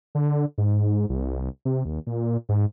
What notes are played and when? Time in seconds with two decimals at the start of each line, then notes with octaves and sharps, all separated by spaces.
0.15 D3
0.58 G#2
1.09 C2
1.65 C3
1.85 D#2
2.07 A#2
2.49 G#2